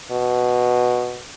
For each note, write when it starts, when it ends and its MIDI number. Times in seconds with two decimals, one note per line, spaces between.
0.12 1.22 47